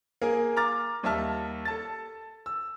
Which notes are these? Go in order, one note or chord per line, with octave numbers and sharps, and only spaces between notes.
A#3 G#4 A#4
A#5 D6 F6 A6
D#2 G3 E5 A5 F6
A4 A5 A6
E6